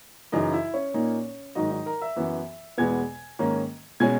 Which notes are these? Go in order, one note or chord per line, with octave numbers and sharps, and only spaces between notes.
F#2 C#3 E3 D#4 D#5
E4 E5
C#4 C#5
A#2 A#3 D#4
G#2 D#3 F#3 D#4 D#5
D#4 D#5
A#4 A#5
E5 E6
F#2 E3 B3
E2 B2 G#3 B3 G#5 G#6
G#2 D#3 A#3 C#4
B2 G#3 C#4 G#5 G#6